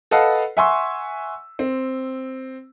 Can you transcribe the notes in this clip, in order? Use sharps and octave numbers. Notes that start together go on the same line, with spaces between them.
A4 B4 D#5 F5 F#5 A5
E5 F#5 G#5 C6 C#6 E6
C4